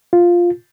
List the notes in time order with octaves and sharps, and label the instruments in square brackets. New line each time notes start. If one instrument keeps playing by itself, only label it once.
[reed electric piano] F4